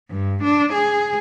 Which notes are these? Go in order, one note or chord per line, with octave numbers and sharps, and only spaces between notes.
G2
D4
G#4